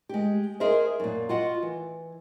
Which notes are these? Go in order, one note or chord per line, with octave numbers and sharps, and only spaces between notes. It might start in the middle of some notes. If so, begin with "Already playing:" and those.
G#3 G4
G#4 A#4 C5 D#5 E5
F#2 A#2
F4 F#4 D#5 F#5
E3